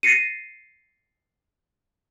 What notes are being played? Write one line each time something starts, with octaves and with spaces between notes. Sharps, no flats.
A6 A#6 C7 C#7 D#7